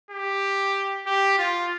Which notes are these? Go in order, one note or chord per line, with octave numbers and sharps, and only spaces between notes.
G4
G4
F4